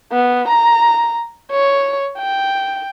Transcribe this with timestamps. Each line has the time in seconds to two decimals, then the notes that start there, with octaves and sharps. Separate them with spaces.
0.13 B3
0.49 A#5
1.51 C#5
2.19 G5